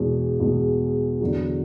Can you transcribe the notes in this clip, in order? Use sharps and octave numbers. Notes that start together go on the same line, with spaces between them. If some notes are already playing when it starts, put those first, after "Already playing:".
Already playing: E2 B2 G#3
E2 B2 G#3
E2 D3 F#3